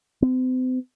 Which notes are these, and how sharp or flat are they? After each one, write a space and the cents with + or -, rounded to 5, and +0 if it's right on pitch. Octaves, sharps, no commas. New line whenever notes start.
C4 -40